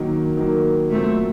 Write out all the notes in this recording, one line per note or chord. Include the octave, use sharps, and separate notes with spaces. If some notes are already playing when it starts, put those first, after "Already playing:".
Already playing: D#3 F#3 A#3
D#3 F#3 A#3
A#2 F#3 A3 C4